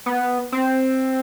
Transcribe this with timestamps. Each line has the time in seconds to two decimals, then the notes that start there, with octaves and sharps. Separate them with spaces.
0.06 B3
0.52 C4